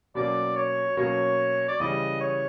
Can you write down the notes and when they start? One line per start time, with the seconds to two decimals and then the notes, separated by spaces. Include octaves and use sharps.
0.15 B2 F#3 A#3 C#4 D5
0.56 C#5
0.97 B2 F#3 A#3 C#4 C#5
1.68 D5
1.80 C#3 E3 G3 D#5
2.21 C#5